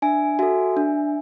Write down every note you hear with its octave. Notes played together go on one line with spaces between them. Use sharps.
D4 E5 G#5
F#4 A4 E5 G#5
D4